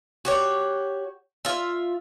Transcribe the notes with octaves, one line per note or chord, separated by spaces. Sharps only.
F#4 G4 C#5
F4 E5